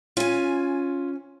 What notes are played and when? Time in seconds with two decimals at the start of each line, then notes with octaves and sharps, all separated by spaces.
0.17 C#4 F4 G#5